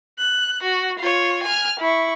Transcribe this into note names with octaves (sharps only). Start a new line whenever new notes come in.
F#6
F#4
F4 C#5
G#5 F6
E4 C#6